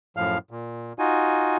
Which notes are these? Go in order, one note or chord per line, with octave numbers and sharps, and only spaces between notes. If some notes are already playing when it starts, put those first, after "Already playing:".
F#2 A2 F3 F5 F6
A#2
D#4 F4 F#4 G#5